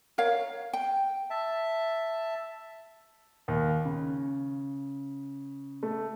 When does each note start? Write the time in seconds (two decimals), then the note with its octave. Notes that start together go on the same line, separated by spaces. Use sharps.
0.18 A#4 C#5 F5
0.73 G5
1.30 E5 A5
3.48 D#2
3.85 C#3
5.83 A3